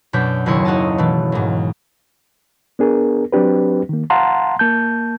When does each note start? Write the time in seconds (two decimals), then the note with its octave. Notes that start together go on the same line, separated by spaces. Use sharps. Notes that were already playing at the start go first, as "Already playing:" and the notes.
0.13 F#2 B2 F#3 D4 G6 B6
0.46 F#1 D#2 E4 C#5 C6
0.65 D#4 F#4 A4 D#5 A5
0.98 B2 E3 A3
1.32 D#2 G#2
2.79 B3 D4 G#4 A#4
3.32 F#3 C4 D4 G4 B4
3.89 D#3 A#3
4.10 F5 F#5 A5 A#5 C6
4.59 A#3 A5 G6